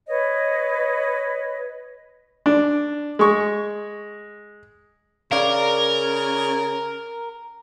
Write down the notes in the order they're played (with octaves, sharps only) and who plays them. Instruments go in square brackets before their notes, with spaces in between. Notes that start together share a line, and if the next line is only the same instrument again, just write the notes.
[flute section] B4 C#5 D#5
[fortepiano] D4
G#3 C#6
[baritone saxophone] C#3 [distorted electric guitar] A#4 [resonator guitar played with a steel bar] D5 F5